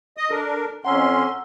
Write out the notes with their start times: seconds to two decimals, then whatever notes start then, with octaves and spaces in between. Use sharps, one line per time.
0.17 D#5 D#6
0.31 D4 A4 A#4
0.85 F2 C#4 F#5 A#5 C6 E6